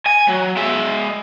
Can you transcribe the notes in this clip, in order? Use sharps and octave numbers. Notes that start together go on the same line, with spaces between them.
G#5
F#3
G#3 E5